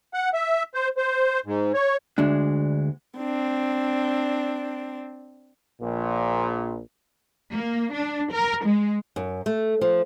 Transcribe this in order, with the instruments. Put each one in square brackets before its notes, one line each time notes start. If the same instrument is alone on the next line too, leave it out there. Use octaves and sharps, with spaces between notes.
[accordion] F#5
E5
C5
C5
G#2
C#5
[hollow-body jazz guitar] D2 G#3 D4
[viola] C4 D4
[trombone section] A#1 A#2
[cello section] A#3
D4
A#4
G#3
[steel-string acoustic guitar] F#2
A3
F3